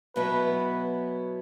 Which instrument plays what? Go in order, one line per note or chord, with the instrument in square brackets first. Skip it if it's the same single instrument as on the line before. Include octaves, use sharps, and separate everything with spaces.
[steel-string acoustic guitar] B2 F#3 B3 E4 [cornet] B4